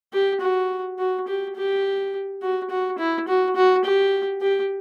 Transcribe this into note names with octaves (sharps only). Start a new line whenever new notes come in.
G4
F#4
F#4
G4
G4
F#4
F#4
E4
F#4
F#4
G4
G4